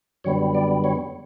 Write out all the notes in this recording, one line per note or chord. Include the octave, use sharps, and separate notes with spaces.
F#2 D3 G3 B3 C#5
D5
C#5